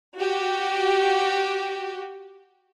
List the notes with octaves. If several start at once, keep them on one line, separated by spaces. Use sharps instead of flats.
F#4 G4